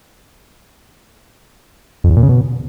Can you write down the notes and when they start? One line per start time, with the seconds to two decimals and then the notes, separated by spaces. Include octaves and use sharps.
2.04 F2
2.10 E2
2.17 A#2
2.23 C#3
2.29 B2